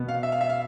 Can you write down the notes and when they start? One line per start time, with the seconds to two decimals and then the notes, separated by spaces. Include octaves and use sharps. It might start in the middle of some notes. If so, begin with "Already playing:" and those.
Already playing: B2 B3
0.08 F5
0.23 E5
0.32 F5
0.41 E5
0.49 F5